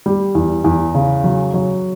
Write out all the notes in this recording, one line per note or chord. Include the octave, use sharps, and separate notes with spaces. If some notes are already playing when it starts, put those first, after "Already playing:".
G3
E2
E2
C#3
F#3
F#3